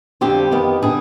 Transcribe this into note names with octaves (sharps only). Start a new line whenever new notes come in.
F2 D3 G3 C4 G4
F2 D#3 B3
D3 G3 B3 G#4